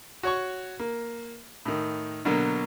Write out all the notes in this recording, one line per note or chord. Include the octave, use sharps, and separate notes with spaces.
F#4 C#5 C#6
A#3
A2 D#3
B2 D3 F#3 A#3